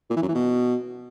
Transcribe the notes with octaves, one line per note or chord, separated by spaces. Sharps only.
A#2
E3
F#2
E3
B2